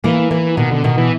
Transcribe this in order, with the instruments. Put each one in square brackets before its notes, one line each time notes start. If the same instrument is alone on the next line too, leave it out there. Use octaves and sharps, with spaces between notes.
[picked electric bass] E3 [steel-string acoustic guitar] A#3
[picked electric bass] E3 [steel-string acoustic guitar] A#3
[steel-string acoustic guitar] B2 [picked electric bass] D#3
[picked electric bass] D3
[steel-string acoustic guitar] B2 [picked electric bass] D#3
[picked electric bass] E3